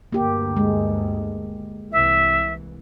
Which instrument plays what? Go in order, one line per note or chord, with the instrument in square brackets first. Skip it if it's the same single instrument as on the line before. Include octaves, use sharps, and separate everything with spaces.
[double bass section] D2 G2 [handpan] A#3 G4
[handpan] G#3
[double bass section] C2 E3 [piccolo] E5